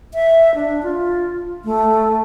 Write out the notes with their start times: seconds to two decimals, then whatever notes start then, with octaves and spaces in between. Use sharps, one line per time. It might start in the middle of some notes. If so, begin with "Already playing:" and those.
0.14 E5
0.55 D4
0.83 F4
1.65 A3